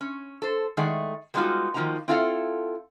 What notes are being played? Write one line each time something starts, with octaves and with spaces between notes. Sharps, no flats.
C#4
A4 C5
D#3 G#3 A3 G#4 D5 F#5
G3 G#3 B3 D#4 F4 F#4
D#3 F3 A#3 D#4 F#4 A#5
C4 E4 F4 A4 F5 F#5